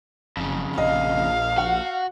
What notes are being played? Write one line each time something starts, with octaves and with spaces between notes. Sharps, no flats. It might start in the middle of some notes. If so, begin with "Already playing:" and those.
F#1 F2 C#3
A#1 D#5 F5
F#4 F#5